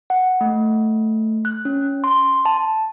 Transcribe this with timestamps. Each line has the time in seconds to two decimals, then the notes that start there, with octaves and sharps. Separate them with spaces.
0.10 F#5
0.41 A3
1.45 F#6
1.65 C#4
2.04 C6
2.45 A5